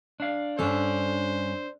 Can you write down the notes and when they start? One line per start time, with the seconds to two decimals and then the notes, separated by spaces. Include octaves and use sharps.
0.20 D4 F5
0.59 G2 C#4 D4 A4 C5